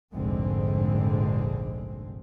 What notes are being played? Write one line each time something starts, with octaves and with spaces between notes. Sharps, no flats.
F1 A#1 G#2 D3 G#3 C4